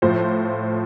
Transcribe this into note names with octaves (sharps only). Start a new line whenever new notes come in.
A2 F3 C5